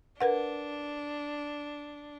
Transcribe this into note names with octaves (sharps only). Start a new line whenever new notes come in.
D4 A#4 B4 F#5